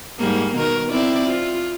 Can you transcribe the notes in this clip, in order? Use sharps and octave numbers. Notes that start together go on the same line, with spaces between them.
G#2 G3 A#3
B2 D#3 A#4
C4 E4 D5
F4